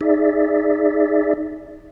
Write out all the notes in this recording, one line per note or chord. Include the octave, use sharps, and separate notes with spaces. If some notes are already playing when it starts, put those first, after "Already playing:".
D#4 G#4 D5 E5